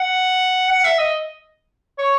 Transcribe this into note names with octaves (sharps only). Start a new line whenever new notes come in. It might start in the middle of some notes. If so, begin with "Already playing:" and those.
Already playing: F#5
F#5
E5
D#5
C#5